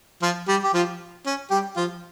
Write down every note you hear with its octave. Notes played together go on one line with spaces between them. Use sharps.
F3 F4
G3 G4
G4
F3 F4
C#4
G3 G4
F3 F4